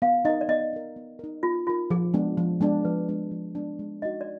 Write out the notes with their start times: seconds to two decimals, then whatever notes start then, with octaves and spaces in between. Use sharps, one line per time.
0.02 B3 F5
0.25 D#4 A#4 D#5
0.41 D5
0.48 B3 D#5
0.73 D#4 A#4
0.96 B3
1.19 D#4 A#4
1.43 B3 F4
1.67 D#4 F4 A#4
1.90 F3 G#4
2.14 G#3 B3 D4
2.37 F3
2.61 G#3 B3 D4
2.85 F3 B4
3.08 G#3 B3 D4
3.31 F3
3.55 G#3 B3 D4
3.79 G#3
4.02 D#4 F#4 D#5
4.21 D5